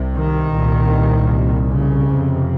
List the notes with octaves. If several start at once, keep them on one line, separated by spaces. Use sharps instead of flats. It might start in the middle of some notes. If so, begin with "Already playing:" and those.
Already playing: C2 C3
D#3
C2 A#2
C#3
F2 C3